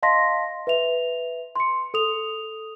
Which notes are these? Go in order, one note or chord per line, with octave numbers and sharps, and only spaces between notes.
D#5 F5 A5 C6 A#6 B6
B4 E5 F7
C6 C#7
A4 D#6 F7